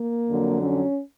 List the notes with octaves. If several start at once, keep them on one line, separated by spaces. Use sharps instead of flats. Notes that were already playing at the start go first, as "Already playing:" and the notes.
Already playing: A#3
F2 D3 F#3
C#4